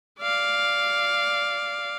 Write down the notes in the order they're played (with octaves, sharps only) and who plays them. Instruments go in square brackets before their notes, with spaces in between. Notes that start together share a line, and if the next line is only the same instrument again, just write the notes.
[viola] D5 F5